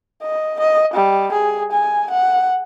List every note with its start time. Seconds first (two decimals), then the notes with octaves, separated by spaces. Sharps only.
0.23 D#5
0.60 D#5
0.94 G3
1.33 G#4
1.72 G#5
2.11 F#5